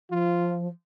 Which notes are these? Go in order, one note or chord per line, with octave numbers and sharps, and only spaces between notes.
F3 F4